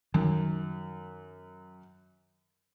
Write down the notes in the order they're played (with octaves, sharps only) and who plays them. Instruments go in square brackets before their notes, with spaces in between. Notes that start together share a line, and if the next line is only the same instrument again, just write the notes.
[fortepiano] F#2 [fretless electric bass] D#3